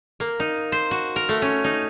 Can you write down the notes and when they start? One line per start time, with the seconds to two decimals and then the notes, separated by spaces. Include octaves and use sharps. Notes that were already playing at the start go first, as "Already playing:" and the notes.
0.20 A#3
0.40 D#4
0.72 C5
0.91 F#4
1.16 A#4
1.29 A3
1.42 C#4
1.64 D#4